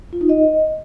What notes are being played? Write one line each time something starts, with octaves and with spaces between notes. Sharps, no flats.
F4
D#4
D#5